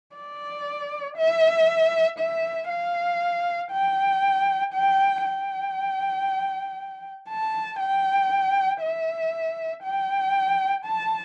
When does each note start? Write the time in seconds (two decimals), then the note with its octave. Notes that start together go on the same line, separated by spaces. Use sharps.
0.16 D5
1.17 E5
2.19 E5
2.69 F5
3.72 G5
4.73 G5
5.25 G5
7.29 A5
7.80 G5
8.82 E5
9.84 G5
10.85 A5